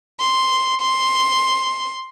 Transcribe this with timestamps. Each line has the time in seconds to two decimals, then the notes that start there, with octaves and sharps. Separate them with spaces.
0.20 C6
0.81 C6